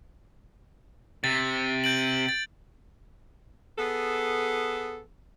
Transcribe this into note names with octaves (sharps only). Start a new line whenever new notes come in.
C3 A6
G6 D7 F#7
A6
B3 G#4 A4